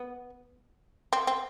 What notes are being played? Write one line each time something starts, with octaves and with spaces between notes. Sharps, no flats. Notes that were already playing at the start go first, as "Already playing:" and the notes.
Already playing: B3
C4
C4